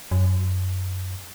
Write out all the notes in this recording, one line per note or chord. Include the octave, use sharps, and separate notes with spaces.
F#2